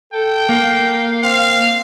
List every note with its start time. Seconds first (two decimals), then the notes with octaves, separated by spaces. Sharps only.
0.13 A4 G5
0.49 A#3 F5
1.23 C4 F5